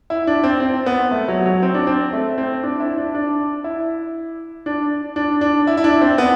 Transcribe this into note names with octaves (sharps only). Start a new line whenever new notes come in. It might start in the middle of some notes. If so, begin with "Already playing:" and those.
E4
D4
C4
C4
B3
A3
F#3
F#3
C4
D4
C4
A3
C4
D4
E4
D4
D4
E4
D4
D4
D4
E4
E4
D4
C4
B3